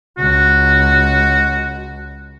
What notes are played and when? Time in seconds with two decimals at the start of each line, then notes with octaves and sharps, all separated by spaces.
0.18 C#2 F#4